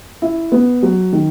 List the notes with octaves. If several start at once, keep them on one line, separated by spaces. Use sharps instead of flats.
E4
B3
F#3
D#3